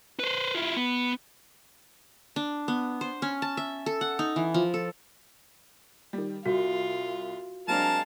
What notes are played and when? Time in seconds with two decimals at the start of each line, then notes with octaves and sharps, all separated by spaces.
0.20 B4 C5
0.55 E4 F4
0.76 B3
2.36 D4
2.68 B3
3.01 C5
3.22 C#4
3.42 A5
3.57 E5
3.86 A4
4.01 F#5
4.19 D#4
4.36 E3
4.54 F3
4.74 A4
6.13 D#3 G3
6.46 C2 F4 F#4
7.68 F#3 G#3 C4 D4 A#4 F5 A5